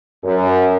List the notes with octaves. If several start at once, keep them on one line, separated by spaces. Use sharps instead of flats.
F#2